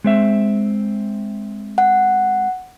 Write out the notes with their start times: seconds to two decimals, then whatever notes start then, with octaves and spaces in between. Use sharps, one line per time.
0.04 G#3 C4 E5
1.78 F#5